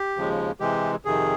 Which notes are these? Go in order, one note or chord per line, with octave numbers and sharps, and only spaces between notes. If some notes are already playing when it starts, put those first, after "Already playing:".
Already playing: G4
D#2 C#3 F3 G#3
C3 E3 G#3 G4
F2 C3 D#3 G#4